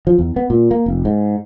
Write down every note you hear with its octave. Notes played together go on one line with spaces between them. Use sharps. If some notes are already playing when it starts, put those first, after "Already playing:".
F3
E2
B3
A#2
A#3
F1
G#2